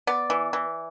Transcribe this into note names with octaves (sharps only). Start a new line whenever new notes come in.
B3 D5
E3
E3